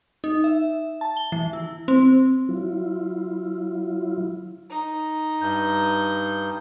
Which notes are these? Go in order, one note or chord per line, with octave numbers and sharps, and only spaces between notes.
D#4
E5
A5
G7
E3
E4
C4
F#3 E4 F4
D#4
G2 G6